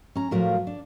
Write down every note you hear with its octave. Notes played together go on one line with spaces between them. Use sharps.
C#4 A#5
A2 F3 F#3 F4 A#4 B4
D4